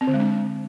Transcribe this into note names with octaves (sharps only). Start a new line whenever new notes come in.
C4
D3
G#3
D4